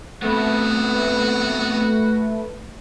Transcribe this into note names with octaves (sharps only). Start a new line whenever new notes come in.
A3 B3 C4 F#4 B4